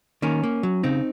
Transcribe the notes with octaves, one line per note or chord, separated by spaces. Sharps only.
D#3 A#3 C#4
A#3
F#3
C#3 C4 D#4